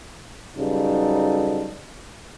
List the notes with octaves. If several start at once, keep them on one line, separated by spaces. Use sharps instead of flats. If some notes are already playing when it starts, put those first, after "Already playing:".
C#3 F#3 G3 D#4 A4 B4